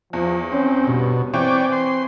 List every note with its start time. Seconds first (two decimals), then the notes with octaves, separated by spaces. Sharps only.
0.13 E2 F3
0.52 C4 C#4
0.87 G2 B2
1.34 E3 C4 C#5 D5 G5
1.72 C6